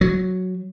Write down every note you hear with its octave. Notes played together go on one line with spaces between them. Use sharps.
F#3